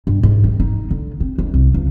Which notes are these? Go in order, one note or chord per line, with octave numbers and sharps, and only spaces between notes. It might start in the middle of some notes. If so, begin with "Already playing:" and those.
G2
G#2
D#3
D#4
D3
C4
D2
C2
C#2